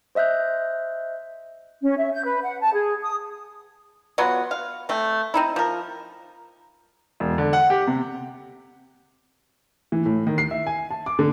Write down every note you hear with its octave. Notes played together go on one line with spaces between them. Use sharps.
C5 D#5 E5 F#6 G6
C#4
E5
G6
B4
F#5
A5
G#4
D#6
F#3 B3 F4 F#4
F5
A3 C4
C4 D#4 E4
F3 A#4
E1
D3
F#5
G4
C3
E3
A2
D#3
C7
E5
G#5
A5
D6
D3